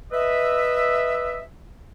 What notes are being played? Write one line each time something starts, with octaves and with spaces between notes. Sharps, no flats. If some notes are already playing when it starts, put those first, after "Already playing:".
B4 D#5 E5